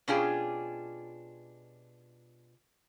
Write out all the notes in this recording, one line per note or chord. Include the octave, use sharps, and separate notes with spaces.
B2 C#4 D4 F4 G4 G#4